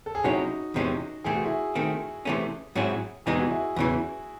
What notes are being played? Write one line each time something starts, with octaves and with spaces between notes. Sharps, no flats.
A4
G#4
C3 F#3 C#4 D#4 E4 F#4
E2 C3 E3 G#3 C#4
C3 E3 A3 C4 G#4
F#4
E4 G#4
D#3 A3 C4
C3 E3 A3 C#4
G#2 F#3 C4 E4 G#4
E2 C3 E3 G#3 D#4 G#4
F#4
E4 G#4
E2 C#3 E3